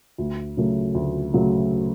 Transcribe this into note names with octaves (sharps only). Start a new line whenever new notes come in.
D2
C#3 F#3 A3
D2
C#3 F#3 A3